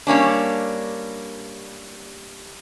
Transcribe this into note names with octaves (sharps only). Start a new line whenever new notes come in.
G3 A#3 C#4 D4